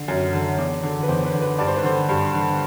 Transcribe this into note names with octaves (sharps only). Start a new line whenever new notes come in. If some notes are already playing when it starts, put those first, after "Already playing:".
Already playing: D3
F#2
D3
E2
D3
B4
E2 C5
B4
D3
B4
G2 D5
C5
B4
D3 C5
G2
D3